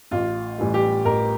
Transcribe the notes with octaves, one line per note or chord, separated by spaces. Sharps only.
A1 F4
A2 E3 G3
G4
A1 A#4